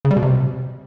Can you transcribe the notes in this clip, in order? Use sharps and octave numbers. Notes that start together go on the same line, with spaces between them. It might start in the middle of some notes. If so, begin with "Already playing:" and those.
C#3
G3
B2
C3